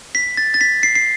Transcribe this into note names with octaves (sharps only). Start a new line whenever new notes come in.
B6
A6
A6
B6
C7
C7